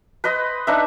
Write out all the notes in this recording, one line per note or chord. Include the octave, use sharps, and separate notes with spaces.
B4 C5 D#5
D4 D#4 B4 E5